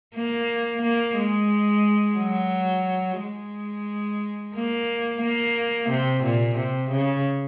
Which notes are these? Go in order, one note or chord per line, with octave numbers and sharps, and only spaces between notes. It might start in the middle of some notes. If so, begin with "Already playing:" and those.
A#3
A#3
G#3
F#3
G#3
A#3
A#3
C3
A#2
C3
C#3